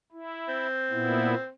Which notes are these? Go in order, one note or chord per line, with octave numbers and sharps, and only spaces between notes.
E4
C4
A#2 B3 E4